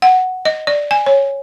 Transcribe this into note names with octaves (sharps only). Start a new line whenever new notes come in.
F#5
D#5
D5
G#5
C#5